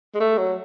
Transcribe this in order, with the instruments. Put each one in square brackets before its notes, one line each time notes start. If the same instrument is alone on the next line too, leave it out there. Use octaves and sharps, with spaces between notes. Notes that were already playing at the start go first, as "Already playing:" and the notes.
[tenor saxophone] G#3
A3
F#3